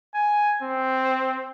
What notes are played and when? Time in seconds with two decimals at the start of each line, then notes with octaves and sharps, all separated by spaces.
0.14 G#5
0.63 C4